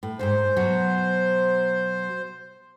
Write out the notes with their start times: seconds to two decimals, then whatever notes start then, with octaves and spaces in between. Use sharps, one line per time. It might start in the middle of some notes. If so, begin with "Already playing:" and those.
0.03 A2
0.19 E2 G#2 C5
0.56 B2 F#3 F#4